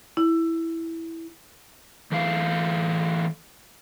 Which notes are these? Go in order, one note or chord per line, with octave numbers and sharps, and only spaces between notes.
E4
E3 A3 F5